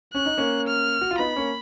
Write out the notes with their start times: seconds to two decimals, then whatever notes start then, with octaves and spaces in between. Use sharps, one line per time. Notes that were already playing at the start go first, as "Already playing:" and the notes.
0.14 C#4 F#6
0.26 D#4
0.37 A#3 C#4
0.67 F6
1.01 F#4
1.11 F4
1.18 B3 D#4 B5
1.36 A#3 C#4